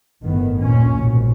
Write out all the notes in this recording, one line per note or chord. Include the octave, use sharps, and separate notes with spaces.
G1 A2 D#3 B3
D#2 A#2 C#4
A#1 G#2 B2